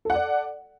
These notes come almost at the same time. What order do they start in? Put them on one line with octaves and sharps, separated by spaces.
A4 F#5 D5